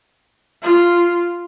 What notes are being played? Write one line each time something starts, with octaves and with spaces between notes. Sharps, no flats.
F4